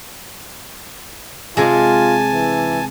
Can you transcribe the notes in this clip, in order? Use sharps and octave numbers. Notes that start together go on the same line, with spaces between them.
C3 G#3 F4 G#5 A5
E3